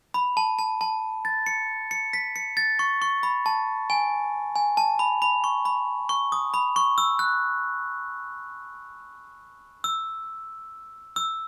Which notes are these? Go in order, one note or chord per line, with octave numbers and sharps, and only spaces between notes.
B5
A5
A5
A5
A6
C#7
C#7
B6
C#7
A6
C#6
C#6
B5
A5
G#5
G#5
A5
B5
B5
C#6
B5
C#6
D#6
B5
C#6
E6
F#6
E6
E6